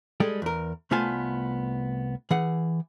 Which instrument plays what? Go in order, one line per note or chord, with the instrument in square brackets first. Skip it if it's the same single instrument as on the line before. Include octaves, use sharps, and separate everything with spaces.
[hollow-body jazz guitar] G3 G#3 G#4 A4 G5
E2 A#4
C2 A3 B3 F4 G#5 A5
E3 G#4 F#5